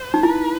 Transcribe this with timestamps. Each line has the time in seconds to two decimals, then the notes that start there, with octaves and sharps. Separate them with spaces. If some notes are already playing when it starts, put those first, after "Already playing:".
Already playing: C5
0.14 D#4
0.23 E4 B4